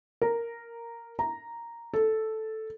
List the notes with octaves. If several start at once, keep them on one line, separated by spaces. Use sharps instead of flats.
A#4
A#5
A4